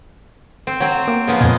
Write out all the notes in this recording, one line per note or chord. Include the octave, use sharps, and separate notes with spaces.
C4
F#3 C4
A#3
C#3 F3 B3
F2 A#2 G#3